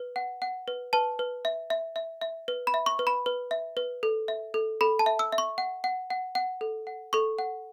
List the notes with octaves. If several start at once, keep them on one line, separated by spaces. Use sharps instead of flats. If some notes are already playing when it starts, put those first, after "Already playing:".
Already playing: B4
F#5
F#5
B4
B4 A5
B4
E5
E5
E5
E5
B4
B5
E5
C#6
B4
B5
B4
E5
B4
A4
E5
A4
A4 B5
A5
E5
E6
E5
C#6
F#5
F#5
F#5
F#5
A4
F#5
A4 C#6
F#5